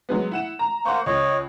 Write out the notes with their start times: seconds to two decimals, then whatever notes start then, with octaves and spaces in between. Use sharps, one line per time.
0.09 F#3 G#3 B3
0.31 E4 F#5 E7
0.59 A#5
0.85 A#3 C5 F#5 C#6
1.06 C#2 C#5 D#5